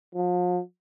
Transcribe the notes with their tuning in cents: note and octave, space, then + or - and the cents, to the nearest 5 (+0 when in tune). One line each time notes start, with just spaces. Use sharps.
F3 +40